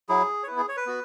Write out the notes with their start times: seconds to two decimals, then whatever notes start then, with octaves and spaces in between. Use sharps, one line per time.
0.09 F#3 E4 G#4
0.43 C#5
0.47 B3 E4 B4
0.58 G#4
0.68 C#5
0.77 B4
0.86 B3 F#4